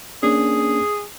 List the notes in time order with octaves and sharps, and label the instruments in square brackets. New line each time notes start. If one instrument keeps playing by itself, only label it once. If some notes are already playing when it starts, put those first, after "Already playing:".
[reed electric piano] A#3 C#4 D4 [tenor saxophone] G#4